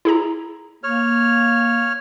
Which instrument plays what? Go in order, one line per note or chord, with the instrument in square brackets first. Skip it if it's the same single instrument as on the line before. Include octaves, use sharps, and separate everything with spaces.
[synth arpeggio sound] E4 G#4 A#5
[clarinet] A#3 [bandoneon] C#5 F6